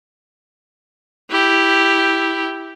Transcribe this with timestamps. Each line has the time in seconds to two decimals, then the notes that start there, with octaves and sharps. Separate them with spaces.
1.30 E4 G4